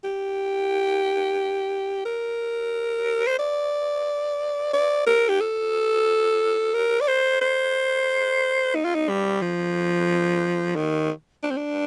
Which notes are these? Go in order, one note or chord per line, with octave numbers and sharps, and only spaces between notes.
G4
A#4
C5
D5
D5
A#4
G4
A4
A#4
D5
C5
C5
D#4
F4
D#4
G3
F3
D#3
D4
C4
D4